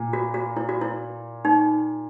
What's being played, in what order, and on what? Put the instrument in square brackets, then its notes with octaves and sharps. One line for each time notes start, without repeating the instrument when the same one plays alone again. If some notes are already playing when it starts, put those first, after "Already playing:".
Already playing: [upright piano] A#2
[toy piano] F#4
F#4
E4
F#4
E4
D#4